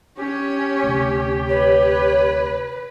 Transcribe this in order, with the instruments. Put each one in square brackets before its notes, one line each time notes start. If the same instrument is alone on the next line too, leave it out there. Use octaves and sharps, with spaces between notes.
[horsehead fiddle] C#4 C#5 [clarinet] G4
[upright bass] D2 C3
[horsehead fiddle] B4 [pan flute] C#5